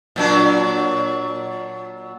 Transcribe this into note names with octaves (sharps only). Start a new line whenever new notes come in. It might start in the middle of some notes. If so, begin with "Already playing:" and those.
A#2 F#3 D4